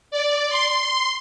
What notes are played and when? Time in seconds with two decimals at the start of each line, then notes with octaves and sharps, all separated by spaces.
0.11 D5
0.50 C6